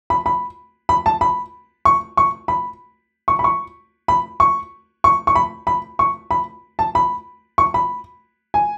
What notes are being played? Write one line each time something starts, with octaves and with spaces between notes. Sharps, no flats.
B5
B5
B5
A5
B5
C#6
C#6
B5
C#6
B5
C#6
B5
C#6
C#6
C#6
B5
B5
C#6
B5
A5
B5
C#6
B5
G#5